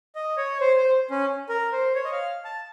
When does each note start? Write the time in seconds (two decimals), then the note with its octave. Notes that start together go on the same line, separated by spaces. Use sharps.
0.15 D#5
0.37 C#5
0.60 C5
0.77 C5
1.10 C#4
1.49 A#4
1.72 C5
1.95 C#5
2.04 D#5
2.12 F5
2.45 A5